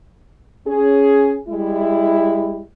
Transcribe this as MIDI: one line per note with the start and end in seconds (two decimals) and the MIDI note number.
0.67 1.37 61
0.67 1.37 68
1.48 2.63 55
1.48 2.63 56
1.48 2.63 64